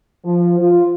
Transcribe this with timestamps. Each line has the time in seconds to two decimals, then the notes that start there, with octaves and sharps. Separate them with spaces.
0.24 F3
0.59 F4